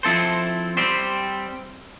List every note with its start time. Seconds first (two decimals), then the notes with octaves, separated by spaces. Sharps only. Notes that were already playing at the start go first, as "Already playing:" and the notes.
0.03 F3 C4 E4 A4 C5
0.77 G3 C4 G4 C5